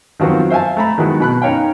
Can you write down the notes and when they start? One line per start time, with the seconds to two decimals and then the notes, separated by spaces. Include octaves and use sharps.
0.20 D#3 F3 F#3 B3 C4
0.50 C5 E5 F5 G#5 A5
0.77 A3 A#5 B5
0.98 D#3 F#3 G#3 B3 E4 F#4
1.20 B2 B5 F#6
1.42 C#4 D#4 C#5 F5 G5